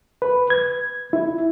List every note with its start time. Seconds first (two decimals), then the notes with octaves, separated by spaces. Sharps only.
0.22 B4
0.50 G#6
1.13 E4